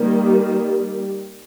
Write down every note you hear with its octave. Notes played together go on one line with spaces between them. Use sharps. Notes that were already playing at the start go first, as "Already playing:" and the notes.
Already playing: D#3 G3 A#3